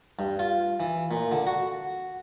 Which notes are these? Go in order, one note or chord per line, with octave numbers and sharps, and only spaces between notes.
G2
F4
E3
A#2
D3
F#4